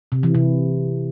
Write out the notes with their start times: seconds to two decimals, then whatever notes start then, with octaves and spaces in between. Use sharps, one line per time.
0.12 C3
0.23 E3
0.35 C3